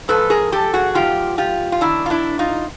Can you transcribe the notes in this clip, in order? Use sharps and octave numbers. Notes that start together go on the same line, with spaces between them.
G#2 F3 A4 B4
G#4 A#4
G4 A4
F#4 G#4
G#2 F3 F4 G4
F4 G4
F4
F#2 D#3 D4 E4
F4
D4 E4
D#4 F4